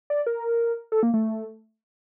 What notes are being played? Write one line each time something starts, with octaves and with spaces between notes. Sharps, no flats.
D5
A#4
A4
A#3
A3